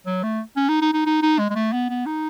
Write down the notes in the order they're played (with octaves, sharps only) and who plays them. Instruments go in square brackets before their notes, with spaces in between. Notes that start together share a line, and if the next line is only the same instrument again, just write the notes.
[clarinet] F#3
A3
C#4
D#4
D#4
D#4
D#4
D#4
G#3
G#3
A3
B3
B3
D#4